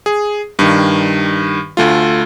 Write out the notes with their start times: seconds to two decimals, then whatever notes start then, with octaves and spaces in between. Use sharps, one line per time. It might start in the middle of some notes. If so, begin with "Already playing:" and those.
0.06 G#4
0.59 G2 D#3
1.77 D2 A3 F4